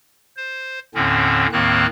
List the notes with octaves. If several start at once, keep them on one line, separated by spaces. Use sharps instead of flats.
C5
D#2 A2 D3 C4 C#4
D#2 A2 D#3 A#3 C4 F#6